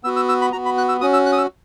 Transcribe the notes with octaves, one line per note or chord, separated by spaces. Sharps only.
B3 F#4 E6
E6
E6
B5
B3 F#4 A#5
B5
F#6
E6
C#4 F#4 D#6
E6
F#6
D#6
E6